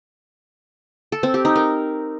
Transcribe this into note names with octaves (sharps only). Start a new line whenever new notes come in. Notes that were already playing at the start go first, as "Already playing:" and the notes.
A4
C4
G4
D#4
A#4